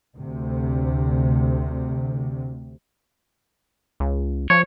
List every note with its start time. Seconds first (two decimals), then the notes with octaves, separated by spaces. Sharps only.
0.15 D2 C3
4.00 C#2
4.50 F3 C#5